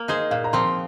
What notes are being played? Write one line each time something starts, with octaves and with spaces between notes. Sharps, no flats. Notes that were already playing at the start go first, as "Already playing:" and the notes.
Already playing: A#3
D#4 G#4 C5 D#5
A#2 F5
A#5
F3 C4 C6